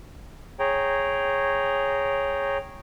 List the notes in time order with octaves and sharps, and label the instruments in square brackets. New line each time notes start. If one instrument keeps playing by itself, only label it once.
[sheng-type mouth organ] G#4 C#5 G5 A#5